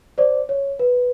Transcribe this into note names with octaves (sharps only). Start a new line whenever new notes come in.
C5 D5
C#5
B4